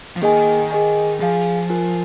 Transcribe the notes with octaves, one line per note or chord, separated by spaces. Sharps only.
F3
D#3 A#3 G#4 D#5 G#5
G#4 D#5 G#5
F3 G#4 F5 G#5
F4 A#4 G#5